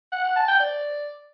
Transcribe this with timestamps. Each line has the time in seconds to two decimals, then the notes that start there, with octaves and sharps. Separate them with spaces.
0.12 F#5
0.24 F#5
0.36 A5
0.48 G5
0.60 D5